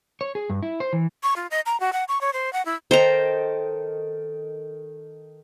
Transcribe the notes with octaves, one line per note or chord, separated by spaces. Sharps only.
C#5
G#4
G2
E4
C5
E3
C#6
F4
D#5
A#5
F#4
F#5
C#6
C#5
C5
F#5
E4
D#3 A4 C5 G5 A#5